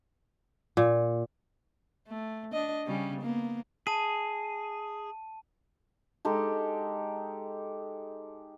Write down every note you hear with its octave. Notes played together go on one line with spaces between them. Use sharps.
A#2
A3
D4 D#5
C#3 G3 C#4
A#3 B3
G#4 A5 D#7
G#3 D#4 G4 A4